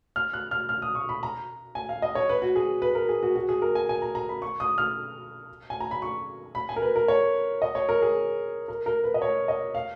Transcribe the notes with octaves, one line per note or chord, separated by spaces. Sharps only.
F6
F#6
F6
F6
D#6
C#6
B5
A#5
G#5
F5
D#5
C#5
B4
F#4
G#4
B4
A#4
G#4
F#4
F#4
G#4
A#4
G#5
G#5
A#5
A#5
B5
C#6
D#6
F6
G#5
A#5
B5
C#6
B5
G#5
A#4
B4
A#4
C#5
D#5
C#5
A#4
G#4
A#4
A#4
B4
D#5
C#5
D#5
F5